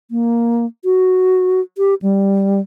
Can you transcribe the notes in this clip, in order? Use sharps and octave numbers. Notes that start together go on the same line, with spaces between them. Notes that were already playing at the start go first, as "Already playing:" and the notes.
A#3
F#4
G4
G3